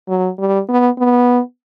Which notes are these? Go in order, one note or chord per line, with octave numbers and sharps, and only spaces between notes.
F#3
G3
B3
B3